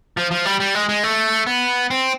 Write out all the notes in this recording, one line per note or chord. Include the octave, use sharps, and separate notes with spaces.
F3
F3
G3
G3
G#3
G#3
A3
B3
C4